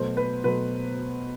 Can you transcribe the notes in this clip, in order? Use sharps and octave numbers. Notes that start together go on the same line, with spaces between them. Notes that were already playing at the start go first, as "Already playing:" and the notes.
Already playing: B2 F#3 A3 C5
B4
B2 F#3 A3 B4